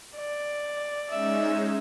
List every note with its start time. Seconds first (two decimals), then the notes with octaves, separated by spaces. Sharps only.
0.16 D5
1.10 G#3 C#4 D#4 E5